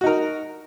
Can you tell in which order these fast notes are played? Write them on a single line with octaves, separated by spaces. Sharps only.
F#4 D#4 A#4